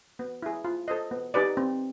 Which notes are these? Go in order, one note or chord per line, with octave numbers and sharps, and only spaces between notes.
B3
E4 G#4
F4
A4 C5 D#5
B3
D#4 G4 B4 D5
C4